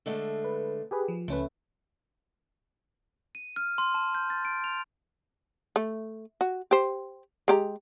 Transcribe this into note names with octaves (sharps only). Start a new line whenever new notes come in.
D3 G#3 A3
B4
G4 G#4 B4
F3
C#2 A3 C#4 B4
D#7
F6
C6
A5
G6
A6
D7
F7
A3
F#4
G4 C5
G#3 G4 A#5